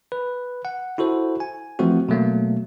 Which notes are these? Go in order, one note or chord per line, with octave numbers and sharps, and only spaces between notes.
B4
F#5
E4 F#4 A4 C5
G#5
E3 F3 A3 C4 F#4
B2 F#3 A3 A#3